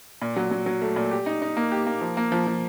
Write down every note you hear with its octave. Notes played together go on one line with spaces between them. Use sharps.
A#2
F#3
F#3
F#3
A3
A#2
G4
D#4
D#4
A#3
G4
A#3
F3
A#3
F3
F3